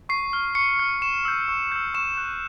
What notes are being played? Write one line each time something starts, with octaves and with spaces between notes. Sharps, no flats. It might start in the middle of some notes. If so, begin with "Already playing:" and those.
C#6 C7
F6
C#6 C#7
F6
C#6 E7
E6 G6
C#6
E6 G6
C#6 E7
F#6